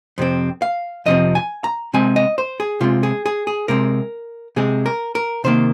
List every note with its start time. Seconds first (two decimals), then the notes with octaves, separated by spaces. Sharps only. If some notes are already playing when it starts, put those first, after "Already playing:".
0.18 F2 C3 C4
0.62 F5
1.06 F2 C3 F3 C4 D#5
1.35 G#5
1.64 A#5
1.94 C3 G#3 C4 G#5
2.16 D#5
2.38 C5
2.60 G#4
2.80 C3 G#3 C4 F4
3.03 G#4
3.26 G#4
3.47 G#4
3.68 C3 G#3 C4 A#4
4.56 C3 G#3 C4 G#4
4.86 A#4
5.15 A#4
5.44 C3 D#3 A#3 C5